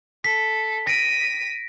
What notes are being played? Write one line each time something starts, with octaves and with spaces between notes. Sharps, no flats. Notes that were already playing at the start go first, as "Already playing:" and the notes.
A4 B6
A#6 B6 D7 D#7